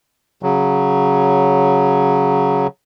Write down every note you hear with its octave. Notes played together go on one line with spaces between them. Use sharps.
C#3 F#3